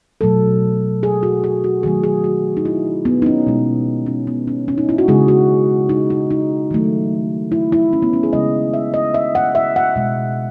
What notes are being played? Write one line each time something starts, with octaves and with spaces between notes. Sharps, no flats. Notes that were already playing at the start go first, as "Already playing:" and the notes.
B2 F#3 A3 A4
G#4
F#4
G#4
F#4
D#3 F#3 A3 G#4
G#4
F#4
D#4
E4
B3
D#4
C#4
B2 G#3
C#4
B3
C#4
C#4
D#4
E4
F#4
C#3 G#3 G#4
F#4
D#4
D#4
D#4
D#3 F#3 A3
E4
E4
C#4
B3
C#4
G#4
C#3 G#3 D#5
E5
D#5
E5
F#5
E5
F#5
B2 G#3